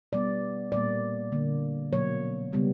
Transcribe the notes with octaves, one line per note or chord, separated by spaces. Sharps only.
B2 G3 B3 D5
A#2 G3 A#3 D5
D3 A#3
B2 F#3 A#3 C#5
C#3 G3 B3